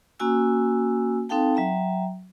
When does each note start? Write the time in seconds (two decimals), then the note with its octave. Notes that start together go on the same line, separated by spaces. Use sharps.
0.20 A#3 C#4 F#4 G#5 E6
1.29 C4 D#4 A4 F5 G5 A5
1.55 F#3 E5 G5 A#5